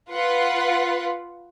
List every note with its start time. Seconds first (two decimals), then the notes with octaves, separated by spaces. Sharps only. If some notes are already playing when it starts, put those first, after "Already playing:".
0.12 F4 B4 F#5